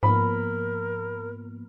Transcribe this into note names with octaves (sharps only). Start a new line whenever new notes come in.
G#2 F3 A#3 B3 A#4 B5